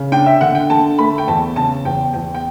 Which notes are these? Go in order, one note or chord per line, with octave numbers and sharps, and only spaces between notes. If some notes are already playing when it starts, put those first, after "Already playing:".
Already playing: C#3
D4 G5
E5
D3 F#5
G5
D3 A5
A3 B5
G5
E2 A5
C#3 A5
E2 G5
E2 G5
G5